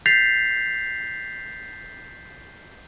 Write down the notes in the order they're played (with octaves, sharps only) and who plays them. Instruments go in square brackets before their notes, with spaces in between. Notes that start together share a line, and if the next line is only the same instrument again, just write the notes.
[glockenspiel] G6 A6 B6 C7 F7